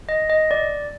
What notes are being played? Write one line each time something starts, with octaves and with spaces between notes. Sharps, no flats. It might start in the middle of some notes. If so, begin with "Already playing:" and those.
D#5
D#5
D5